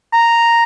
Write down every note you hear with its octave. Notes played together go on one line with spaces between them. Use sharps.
A#5